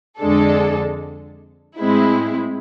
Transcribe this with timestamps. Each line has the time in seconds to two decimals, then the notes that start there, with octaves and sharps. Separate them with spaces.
0.19 F2 D3 G#3 D4 A4
1.78 A2 G#3 C4 E4